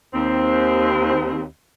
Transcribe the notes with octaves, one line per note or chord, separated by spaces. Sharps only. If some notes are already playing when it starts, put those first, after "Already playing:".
D#2 C4